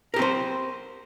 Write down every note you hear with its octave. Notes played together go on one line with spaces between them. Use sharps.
C4 G4 A#4 C5